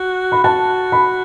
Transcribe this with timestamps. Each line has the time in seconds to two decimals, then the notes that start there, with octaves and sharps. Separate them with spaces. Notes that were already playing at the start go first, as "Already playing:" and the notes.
Already playing: F#4
0.32 B5
0.44 F#4 A5
0.92 B5